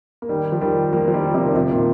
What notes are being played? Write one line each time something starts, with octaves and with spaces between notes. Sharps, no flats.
A#3
D#3 G3
F3
D#3 G3
F3 A#3
F3
D#3 G3
C3 F3
D#3
C3 F3
A#2 D#3